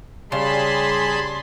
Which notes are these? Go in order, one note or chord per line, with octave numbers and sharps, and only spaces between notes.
C#3 G3 G#4 A5 B5 C6